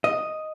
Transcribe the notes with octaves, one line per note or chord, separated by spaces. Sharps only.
D#5